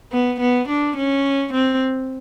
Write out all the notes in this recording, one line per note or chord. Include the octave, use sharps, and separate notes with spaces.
B3
B3
D4
C#4
C4